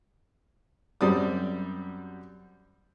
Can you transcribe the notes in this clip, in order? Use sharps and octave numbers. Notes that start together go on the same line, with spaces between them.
F#2 G3 C4 D5 D#6